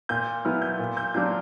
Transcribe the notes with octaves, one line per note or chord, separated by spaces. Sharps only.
A#2 G6
F#3 B3 E4 F6
G6
A#2
G6
F#3 A#3 D4 F4 G6